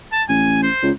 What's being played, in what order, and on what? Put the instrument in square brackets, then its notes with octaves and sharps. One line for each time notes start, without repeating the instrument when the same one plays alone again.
[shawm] A5
[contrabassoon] A1 [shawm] G#5
[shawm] C5
[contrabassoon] C#2